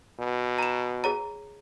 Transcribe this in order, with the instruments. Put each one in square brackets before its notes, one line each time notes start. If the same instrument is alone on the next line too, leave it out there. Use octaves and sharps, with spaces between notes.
[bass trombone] B2
[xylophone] A#5 E7
G#4 C#5 A#5